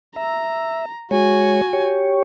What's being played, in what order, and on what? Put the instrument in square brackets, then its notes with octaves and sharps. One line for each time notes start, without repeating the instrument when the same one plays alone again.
[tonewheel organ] E5 [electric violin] A#5
[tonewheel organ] G#3 C#5 [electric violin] F#4 G#5
[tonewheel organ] G4 C#5